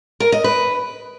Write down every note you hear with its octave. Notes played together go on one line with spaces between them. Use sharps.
A#4
D#5
B4